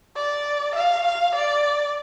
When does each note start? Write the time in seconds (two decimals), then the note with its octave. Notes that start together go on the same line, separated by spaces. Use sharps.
0.16 D5
0.75 F5
1.05 F5
1.35 D5